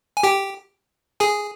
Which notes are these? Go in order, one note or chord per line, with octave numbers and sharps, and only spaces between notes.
G#5
G4 G5
G#4 G#5